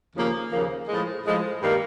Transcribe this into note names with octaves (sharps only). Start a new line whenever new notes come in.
D#2 C#3 F3 A#3
D#2 C#3 F3 A#3
A2 F3 G#3
A2 F3 G#3
G2 D#3 G3 A#3